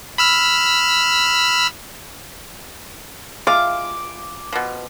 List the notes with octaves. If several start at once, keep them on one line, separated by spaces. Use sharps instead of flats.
B5 E6 F6
G#3 F4 F5 D6
B2 F3